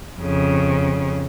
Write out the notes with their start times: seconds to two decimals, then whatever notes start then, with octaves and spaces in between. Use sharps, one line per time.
0.20 F2 C#3